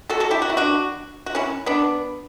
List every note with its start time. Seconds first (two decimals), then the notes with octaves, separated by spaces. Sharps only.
0.09 F#4 A4
0.20 F#4 A4
0.31 E4 G4
0.42 F#4
0.50 E4
0.57 D4 F#4
1.26 F#4
1.35 C#4 E4
1.66 B3 D4